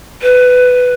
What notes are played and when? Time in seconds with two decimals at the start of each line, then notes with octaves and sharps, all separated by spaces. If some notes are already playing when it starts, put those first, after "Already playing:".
0.22 B4